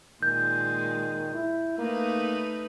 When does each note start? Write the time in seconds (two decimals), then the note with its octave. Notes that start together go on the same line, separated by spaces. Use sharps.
0.23 A#2 D#3 G#3 G6
1.34 E4
1.78 A3 A#3 D#4 B4